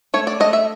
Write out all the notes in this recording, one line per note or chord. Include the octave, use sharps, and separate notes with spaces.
A3 C#5
D5
A3 D#5
E5